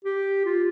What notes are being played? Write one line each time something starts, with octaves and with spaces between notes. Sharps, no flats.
G4
F4